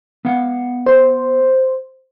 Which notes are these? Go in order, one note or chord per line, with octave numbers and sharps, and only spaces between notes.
B3 F5 F#5
C5